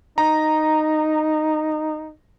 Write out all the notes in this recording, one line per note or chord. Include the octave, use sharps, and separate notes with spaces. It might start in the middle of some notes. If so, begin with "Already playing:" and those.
D#4 A#5